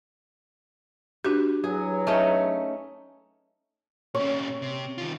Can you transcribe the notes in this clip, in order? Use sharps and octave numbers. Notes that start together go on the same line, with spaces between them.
D4 F#4 G4 B4
E2 F#3 G#4
A3 C#4 D#4
A#2 C#4 C#5
C3
D#3 F4